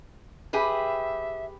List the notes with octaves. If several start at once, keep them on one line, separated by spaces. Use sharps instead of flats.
G4 G#4 B4 E5